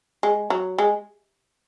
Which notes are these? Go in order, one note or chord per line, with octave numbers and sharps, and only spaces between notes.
G#3
F#3
G#3